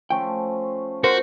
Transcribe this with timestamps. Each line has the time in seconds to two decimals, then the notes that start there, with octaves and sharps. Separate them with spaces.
0.10 F3 A3 C#4 G5
1.04 F#4 A#4 C5